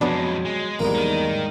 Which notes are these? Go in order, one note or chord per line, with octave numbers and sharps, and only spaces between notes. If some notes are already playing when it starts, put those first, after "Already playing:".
F2 F#3 G#3 B3 D4
G#3
G#1 E2 G#2 G3 G#3 A#3
D#4 A#4